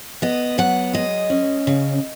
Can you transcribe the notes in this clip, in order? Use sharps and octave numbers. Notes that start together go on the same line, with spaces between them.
B3 D#5
F#3 F#5
G#3 D#5
C#4
C#3